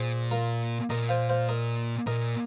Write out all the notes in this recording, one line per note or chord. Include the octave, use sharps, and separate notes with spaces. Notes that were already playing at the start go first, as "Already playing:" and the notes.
Already playing: A#2 G#4 C5
F4 A#4
A#2 A#4 D#5
C5 F5
C5 F5
A#4 D#5
A#2 A#4 D#5